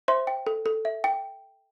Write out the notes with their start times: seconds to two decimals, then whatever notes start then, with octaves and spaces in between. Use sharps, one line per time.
0.08 C5 E5 C6
0.27 G5
0.47 A4
0.66 A4
0.85 E5
1.04 G5